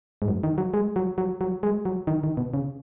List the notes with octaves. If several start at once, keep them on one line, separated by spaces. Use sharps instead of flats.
G#2
F#2
D#3
F#3
G#3
F#3
F#3
F#3
G#3
F#3
D#3
D#3
B2
C#3